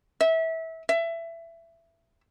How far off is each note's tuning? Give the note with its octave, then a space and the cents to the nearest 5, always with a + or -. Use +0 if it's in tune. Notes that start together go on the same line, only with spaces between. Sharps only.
E5 -25
E5 +20